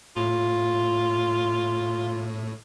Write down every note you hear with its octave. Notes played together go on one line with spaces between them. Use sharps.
A2 F4